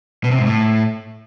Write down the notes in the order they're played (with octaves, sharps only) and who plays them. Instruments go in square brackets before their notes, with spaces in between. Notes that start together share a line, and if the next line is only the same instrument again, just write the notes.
[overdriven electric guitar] B2
C3
G#2
A2